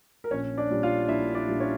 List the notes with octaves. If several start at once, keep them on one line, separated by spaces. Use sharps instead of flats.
A#4
A#1 C#4 C#5
D4 D5
A#2 G3
F4 F5
A#1 E4 E5
D4 D5
A#2 G3
C#4 C#5